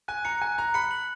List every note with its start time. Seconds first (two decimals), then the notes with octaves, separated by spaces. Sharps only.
0.08 G#5 F#6
0.25 A#5 C#7
0.41 G#5 F#6
0.58 A#5 F#6
0.74 B5 C#7
0.91 F#7